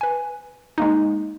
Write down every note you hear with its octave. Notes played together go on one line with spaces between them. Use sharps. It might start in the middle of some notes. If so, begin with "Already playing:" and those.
B4 G#5
G#3 A#3 D#4